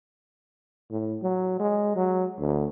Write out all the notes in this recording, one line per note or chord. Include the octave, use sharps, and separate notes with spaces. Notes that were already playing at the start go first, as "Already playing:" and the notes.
A2
F#3
G#3
F#3
D2